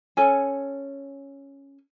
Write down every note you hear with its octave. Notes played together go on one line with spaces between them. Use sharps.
C#4 A4 G#5